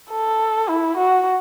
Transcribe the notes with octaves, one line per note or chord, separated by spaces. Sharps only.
A4
E4
F#4